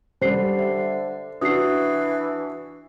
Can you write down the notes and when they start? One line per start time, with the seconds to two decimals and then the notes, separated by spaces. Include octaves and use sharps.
0.22 D3 G3 C5 C7
0.59 E5
1.42 E3 D4 F#4 D#6 C7